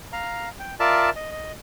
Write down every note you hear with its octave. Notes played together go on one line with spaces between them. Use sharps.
F5 A#5
G5
F4 A#4 D5 E5 A5
D#5
D#5